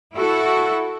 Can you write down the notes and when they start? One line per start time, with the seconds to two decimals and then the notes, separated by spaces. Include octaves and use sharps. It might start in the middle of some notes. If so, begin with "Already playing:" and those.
0.14 E4 F#4 A4